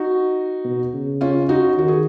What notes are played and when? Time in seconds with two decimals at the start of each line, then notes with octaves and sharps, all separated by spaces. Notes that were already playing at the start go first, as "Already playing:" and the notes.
Already playing: D#4 F#4
0.64 B2
0.94 C#3
1.21 C#4 F4
1.49 D#4 F#4
1.77 D#3 F#4
1.88 G#4